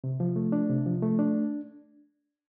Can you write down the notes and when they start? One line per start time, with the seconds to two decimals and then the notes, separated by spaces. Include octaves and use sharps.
0.04 C3
0.20 F3
0.36 A3
0.52 D4
0.69 C3
0.86 F3
1.02 A3
1.19 D4